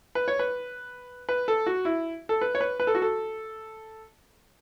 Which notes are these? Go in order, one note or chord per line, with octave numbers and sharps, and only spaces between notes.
B4
C#5
B4
B4
A4
F#4
E4
A4
B4
C#5
B4
B4
A4
F#4
A4